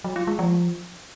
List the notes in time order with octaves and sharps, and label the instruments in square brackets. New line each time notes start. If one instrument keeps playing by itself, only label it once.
[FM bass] F#3
F4
G#3
F3